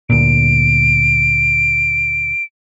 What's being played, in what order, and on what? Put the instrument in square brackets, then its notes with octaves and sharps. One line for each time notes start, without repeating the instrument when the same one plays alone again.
[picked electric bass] D2 A#2 [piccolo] D7